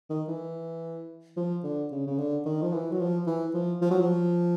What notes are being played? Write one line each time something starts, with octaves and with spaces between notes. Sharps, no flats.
D#3
E3
F3
D3
C#3
C#3
D3
D#3
F3
E3
F#3
F3
E3
F3
F3
F#3
F3